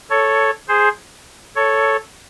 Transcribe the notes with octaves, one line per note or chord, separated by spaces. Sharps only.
A4 C#5
G#4 C5
A4 C#5